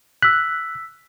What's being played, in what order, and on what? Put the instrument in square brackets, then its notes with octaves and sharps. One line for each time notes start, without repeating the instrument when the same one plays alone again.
[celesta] E6 B6 [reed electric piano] F#6